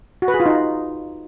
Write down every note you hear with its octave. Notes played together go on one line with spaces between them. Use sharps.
F#4
B4
G#4
F4
D#4